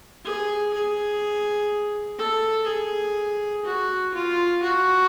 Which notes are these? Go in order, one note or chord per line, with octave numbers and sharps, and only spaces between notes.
G#4
G#4
A4
G#4
F#4
F4
F#4